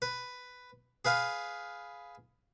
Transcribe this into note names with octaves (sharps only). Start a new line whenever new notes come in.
B4
G#4 B4 F5